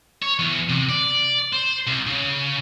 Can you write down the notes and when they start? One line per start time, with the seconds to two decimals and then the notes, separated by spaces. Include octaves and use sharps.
0.22 C#5
0.39 E2
0.69 C3
0.89 D5
1.53 C5
1.87 C2
2.07 C#3